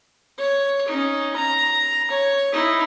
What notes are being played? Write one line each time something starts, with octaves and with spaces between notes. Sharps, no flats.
C#5
C#4 D#4
A#5
C#5
D#4 E4